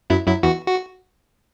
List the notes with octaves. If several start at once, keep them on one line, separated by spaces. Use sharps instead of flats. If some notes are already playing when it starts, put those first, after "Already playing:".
F#2 F#3 E4
F#2 F#3 E4
E2 E3 F#4
F#4